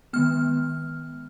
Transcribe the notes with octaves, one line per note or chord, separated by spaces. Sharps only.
D#3 G#3 B3 F6